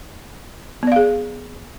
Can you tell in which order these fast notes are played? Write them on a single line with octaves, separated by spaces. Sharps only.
B3 D5 F5 G#4